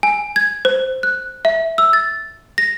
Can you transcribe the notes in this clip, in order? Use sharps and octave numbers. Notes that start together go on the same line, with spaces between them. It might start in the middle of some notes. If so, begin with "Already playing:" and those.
G#5
G#6
C5
F#6
E5
E6
A6
A#6